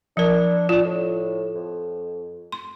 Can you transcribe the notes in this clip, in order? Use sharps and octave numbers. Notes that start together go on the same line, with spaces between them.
F3 D4 A#4
D4 F4
A2
F2
C6